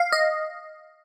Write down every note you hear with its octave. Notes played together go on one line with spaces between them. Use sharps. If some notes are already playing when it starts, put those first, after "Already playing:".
Already playing: F5
D#5